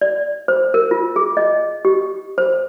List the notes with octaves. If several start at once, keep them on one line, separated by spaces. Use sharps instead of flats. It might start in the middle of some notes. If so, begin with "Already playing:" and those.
D5
C5
A#4
F4
G#4
D#5
G4
C5